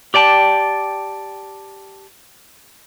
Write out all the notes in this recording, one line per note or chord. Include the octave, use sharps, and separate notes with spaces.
G4 D5 G5 A5